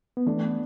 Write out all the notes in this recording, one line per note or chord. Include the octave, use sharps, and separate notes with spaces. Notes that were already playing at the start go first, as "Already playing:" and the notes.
B3
E3 A3 D4
B3